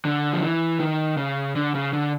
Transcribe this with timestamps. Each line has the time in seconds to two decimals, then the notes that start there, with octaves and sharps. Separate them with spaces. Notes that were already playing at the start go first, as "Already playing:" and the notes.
0.05 D3
0.33 F3
0.42 E3
0.80 D#3
1.17 C#3
1.55 D3
1.75 C#3
1.93 D3